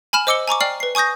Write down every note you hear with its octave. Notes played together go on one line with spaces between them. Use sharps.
G#5 B5 F6 E7 F#7
C5 D#5 D6 E6 C#7 G7
G#5 A#5 C#6 D6
D5 G5 F6 C7 F#7
B4 C7
G#5 C#6 D#6 G6 A#6